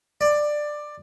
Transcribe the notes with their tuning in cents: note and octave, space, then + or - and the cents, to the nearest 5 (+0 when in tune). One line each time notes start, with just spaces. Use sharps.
D5 +15